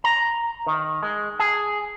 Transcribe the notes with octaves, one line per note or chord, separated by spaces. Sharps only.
A#5
D#3
G#3
G#4